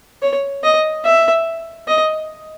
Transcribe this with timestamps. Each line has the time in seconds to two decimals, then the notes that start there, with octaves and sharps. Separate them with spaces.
0.23 C#5
0.64 D#5
1.05 E5
1.88 D#5